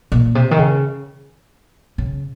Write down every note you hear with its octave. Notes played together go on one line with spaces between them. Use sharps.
A#2
C3
D#3
C#3
C#3